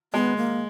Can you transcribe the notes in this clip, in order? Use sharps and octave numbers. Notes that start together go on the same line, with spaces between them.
G#3 B3
A#3